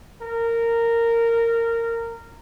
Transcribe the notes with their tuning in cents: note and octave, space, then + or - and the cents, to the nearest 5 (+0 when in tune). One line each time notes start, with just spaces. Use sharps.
A#4 -15